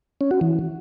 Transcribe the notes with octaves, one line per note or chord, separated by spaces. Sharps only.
C#4
F#4
E3